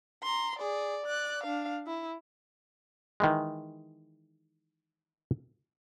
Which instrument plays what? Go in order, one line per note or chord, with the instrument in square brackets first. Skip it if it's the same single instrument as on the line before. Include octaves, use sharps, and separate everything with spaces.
[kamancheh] A#5 C6
G#4 D5
D5 F#6
D4 F5
E4
[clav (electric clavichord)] D#3 E3 G#3